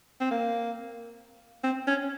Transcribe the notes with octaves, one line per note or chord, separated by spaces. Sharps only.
C4
A#3
C4
C#4